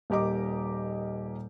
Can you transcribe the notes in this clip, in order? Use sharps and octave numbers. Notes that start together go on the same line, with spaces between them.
D#1 A#3 G4 D#5 D6